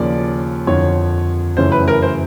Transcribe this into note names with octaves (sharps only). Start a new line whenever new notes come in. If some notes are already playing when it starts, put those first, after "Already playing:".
Already playing: D#2 C#3 F3 D5
F2 D3 F3 C#5
F#2 C#3 E3 A3 C#4 C5
B4
A#4
C5